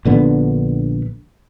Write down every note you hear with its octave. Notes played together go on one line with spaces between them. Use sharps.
A#1 D3 B3